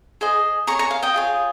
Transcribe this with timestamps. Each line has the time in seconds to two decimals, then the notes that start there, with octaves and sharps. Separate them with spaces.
0.21 G#4 C5 D#5
0.67 G#4 C#5 A#5 C#6
0.79 A#5 C#6
0.91 F5
1.02 D#5 G5
1.14 F4 G#4 C#5